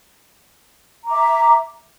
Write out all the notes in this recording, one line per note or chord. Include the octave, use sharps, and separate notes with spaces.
E5 A#5 D6